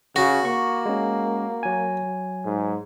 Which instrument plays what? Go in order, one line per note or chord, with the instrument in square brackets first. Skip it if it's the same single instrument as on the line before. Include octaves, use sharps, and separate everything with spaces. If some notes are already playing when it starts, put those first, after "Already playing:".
[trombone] C#3 [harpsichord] F#4
[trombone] A#3 [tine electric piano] C#6
[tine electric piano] G#3 C#4
F#3 G#5
[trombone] G#2